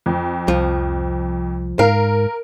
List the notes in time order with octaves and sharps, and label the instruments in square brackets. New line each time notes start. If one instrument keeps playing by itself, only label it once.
[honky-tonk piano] F2
[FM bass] C2 [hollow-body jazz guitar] F3
[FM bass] G#2 [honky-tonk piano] A#4 [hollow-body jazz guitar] F5